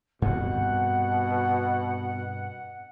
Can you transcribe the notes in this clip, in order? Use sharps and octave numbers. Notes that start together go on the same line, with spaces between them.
G2 B2 C4 F#5